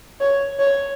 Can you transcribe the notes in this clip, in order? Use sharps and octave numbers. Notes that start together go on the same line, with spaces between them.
C#5
C#5